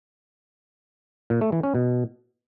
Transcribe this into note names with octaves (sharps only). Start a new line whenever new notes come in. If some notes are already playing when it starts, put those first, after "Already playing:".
A#2
A3
E3
C#4
B2